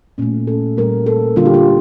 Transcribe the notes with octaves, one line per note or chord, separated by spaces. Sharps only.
A#2 A3 C#4
A4
A#2 G3 A#3 A#4
A4
D3 G3 A#3 F4
G4
F4